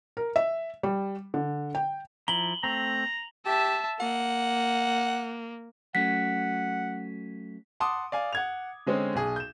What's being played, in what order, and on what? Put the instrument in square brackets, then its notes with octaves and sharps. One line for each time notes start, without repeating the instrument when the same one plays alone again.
[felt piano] A#4
E5
G3
D3
G5
[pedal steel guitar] F3 E4 A#5 [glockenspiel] F#7 G7
[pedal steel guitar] A3 C4 [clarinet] A#5
[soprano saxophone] G4 [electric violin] E5 A5
[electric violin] A#3 [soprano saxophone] F#5
[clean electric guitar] F#3 A3 C#4 [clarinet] F#5 [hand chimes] B6
[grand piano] F#5 A5 C6 D6 D#6
D5 F5 G#5
F#5 G#6 F7
D3 G#3 C4 C#4 C5
B1 G#4
G6 E7